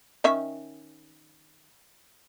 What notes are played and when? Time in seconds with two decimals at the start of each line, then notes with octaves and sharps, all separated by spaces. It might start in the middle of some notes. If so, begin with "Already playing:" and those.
0.24 D#3 C#4 E5